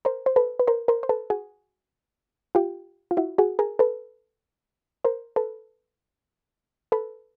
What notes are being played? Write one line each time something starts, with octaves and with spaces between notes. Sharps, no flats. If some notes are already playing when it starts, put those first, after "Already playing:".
A#4 C5
C5
A4 B4
B4
A#4 C5
A#4 C5
C5
A4 B4
F#4 G#4
F4 G4
F4
E4 F#4
F#4 G#4
G#4 A#4
A4 B4
A#4 C5
A4 B4
A4 B4